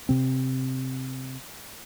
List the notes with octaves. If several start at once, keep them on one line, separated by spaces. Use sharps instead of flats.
C3 C4